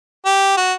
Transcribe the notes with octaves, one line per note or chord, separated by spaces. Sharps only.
G4
F#4